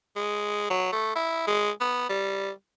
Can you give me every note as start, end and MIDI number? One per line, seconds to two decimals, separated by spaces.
0.16 0.66 56
0.70 0.90 54
0.92 1.15 57
1.15 1.42 64
1.47 1.71 56
1.80 2.07 59
2.09 2.51 55